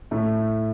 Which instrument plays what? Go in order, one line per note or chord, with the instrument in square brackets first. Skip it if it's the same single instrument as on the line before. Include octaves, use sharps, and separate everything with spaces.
[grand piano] A2 A3